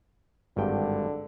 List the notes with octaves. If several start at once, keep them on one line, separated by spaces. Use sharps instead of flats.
G#1 G2 D3 G5